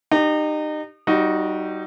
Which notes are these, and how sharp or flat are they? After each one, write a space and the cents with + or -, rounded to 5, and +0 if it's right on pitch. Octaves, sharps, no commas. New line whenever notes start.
D#4 -30 G4 +0
G3 -25 D#4 +0 F#4 -15